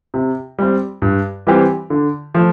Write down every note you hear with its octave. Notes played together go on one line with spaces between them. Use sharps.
C3
G3 C4
G2
E3 G3 C4 G4
D3
F3 A3